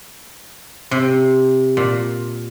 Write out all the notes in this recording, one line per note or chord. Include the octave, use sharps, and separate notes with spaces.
C3
A#2